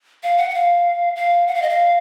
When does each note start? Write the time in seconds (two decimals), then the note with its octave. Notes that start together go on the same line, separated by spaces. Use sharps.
0.23 F5
0.38 F#5
0.50 F#5
0.54 F5
1.16 F5
1.48 F#5
1.55 F5
1.62 D#5
1.69 F5